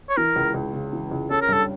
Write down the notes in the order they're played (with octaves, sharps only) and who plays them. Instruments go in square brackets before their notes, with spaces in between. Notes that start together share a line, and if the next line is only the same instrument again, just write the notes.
[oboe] C#5
[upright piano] E3 [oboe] A#4
[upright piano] C#2
C#2
C#3
E3
C#2
[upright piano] C#4 [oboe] A4
[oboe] A#4
[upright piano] G2 [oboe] A4